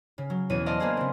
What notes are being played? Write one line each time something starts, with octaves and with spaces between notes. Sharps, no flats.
C#3
F#3
E2 B2 C#4 C#5 D#7
C5 D5 D#5 F5 A5
A#3 B3 D4 F4 G#4 C5
C#3 C4